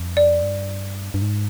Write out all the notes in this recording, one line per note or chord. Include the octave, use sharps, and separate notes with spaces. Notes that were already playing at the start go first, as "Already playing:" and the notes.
Already playing: F2
D5
G2
G2
G#2